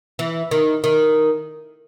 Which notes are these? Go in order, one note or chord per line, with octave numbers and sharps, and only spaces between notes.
E3
D#3
D#3